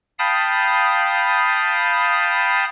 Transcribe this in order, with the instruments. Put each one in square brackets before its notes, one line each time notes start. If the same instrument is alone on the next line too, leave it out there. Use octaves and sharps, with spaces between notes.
[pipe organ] F5 G5 A5 B5 D#6